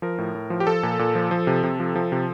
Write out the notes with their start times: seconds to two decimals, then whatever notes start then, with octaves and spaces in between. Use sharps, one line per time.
0.02 F3 A#4
0.18 A2
0.35 A2
0.50 F3
0.60 G4
0.67 F3 A4
0.83 A#2
0.99 A#2
1.15 F3
1.31 F3
1.47 C3
1.64 C3
1.80 F3
1.95 F3
2.12 C3